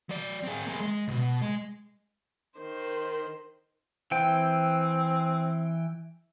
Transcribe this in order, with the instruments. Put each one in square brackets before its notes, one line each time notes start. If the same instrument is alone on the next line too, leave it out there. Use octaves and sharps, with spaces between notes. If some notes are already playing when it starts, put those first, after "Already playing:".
[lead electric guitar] F#3 D5
C4 G#4
A#3 G#4
G#3
C2 B2
G#3
[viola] D#3 C5
[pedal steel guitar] E3 G5 [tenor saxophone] C4